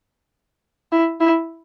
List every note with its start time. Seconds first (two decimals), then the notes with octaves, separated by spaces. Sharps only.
0.92 E4
1.20 E4